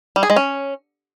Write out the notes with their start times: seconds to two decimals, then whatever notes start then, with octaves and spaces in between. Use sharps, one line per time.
0.16 G3
0.23 G#4
0.30 G#3
0.36 C#4